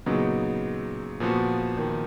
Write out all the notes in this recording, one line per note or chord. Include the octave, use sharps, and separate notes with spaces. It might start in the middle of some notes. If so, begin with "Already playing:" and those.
A#2 C#3 F#3 B3 D#4
A#2 F3 B3 F#4
D#3